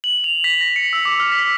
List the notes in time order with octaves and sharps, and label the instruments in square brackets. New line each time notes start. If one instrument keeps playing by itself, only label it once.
[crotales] F#7
F7
B6
A#6
C#7
E6
D6
F6
B6